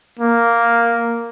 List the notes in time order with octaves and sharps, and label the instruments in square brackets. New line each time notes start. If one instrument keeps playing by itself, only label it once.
[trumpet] A#3